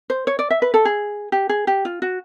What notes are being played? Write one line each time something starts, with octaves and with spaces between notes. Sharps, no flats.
C5
C#5
D5
E5
B4
A4
G#4
G4
G#4
G4
F4
F#4